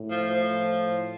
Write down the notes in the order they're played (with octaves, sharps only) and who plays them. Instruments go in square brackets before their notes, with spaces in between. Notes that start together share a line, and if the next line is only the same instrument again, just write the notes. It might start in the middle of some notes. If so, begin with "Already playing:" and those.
Already playing: [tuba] A2
[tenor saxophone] F3
F3